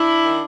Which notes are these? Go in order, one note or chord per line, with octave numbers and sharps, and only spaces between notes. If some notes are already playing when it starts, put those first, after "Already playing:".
Already playing: D4 E4
D#3